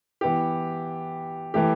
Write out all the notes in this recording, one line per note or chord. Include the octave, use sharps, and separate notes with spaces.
E3 B3 G4
E3 A3 G4